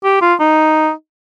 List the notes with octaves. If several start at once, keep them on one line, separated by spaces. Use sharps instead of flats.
G4
F4
D#4